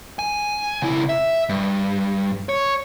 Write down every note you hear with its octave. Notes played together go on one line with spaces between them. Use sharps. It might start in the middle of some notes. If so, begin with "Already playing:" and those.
G#5
C#2 E4
E5
G2
C#5